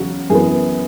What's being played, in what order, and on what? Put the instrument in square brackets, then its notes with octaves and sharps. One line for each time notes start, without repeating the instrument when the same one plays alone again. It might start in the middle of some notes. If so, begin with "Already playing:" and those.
Already playing: [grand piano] E2 C#3 F#3 F#4
F#2 E3 B3 G#4